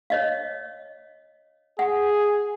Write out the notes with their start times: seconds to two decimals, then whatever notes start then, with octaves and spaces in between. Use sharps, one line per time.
0.10 C#5 D#5 F5
1.79 G#4 F#5